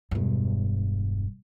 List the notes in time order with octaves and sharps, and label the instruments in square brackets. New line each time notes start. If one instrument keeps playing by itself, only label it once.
[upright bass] E1 G2